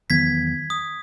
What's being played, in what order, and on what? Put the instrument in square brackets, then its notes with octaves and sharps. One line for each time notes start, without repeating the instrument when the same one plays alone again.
[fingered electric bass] E2 D#3 F#3 B3 [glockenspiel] G#6 B6
[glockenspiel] D#6